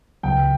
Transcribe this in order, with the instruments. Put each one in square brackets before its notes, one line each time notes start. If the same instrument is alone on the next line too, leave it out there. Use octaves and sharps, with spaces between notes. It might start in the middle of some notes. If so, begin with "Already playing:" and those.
[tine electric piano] C#2 C#3 F#3 [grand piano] G5